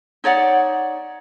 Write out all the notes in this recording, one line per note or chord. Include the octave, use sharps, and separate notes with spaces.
D#4 C#5 D5 F#5